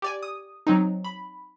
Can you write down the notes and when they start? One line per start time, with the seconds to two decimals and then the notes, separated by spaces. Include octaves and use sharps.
0.02 G4 D5 G#5
0.23 D#6
0.67 F#3 C4 D#4
1.04 B5